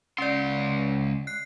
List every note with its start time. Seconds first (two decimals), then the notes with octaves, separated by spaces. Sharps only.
0.18 C#2 C#4 D5 C6
1.27 F#6 C7